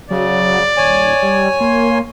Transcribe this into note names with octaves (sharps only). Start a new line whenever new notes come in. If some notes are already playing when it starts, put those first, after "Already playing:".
C#3 F#3 D5
D#1 C#5 G#5
G3
A#3 C6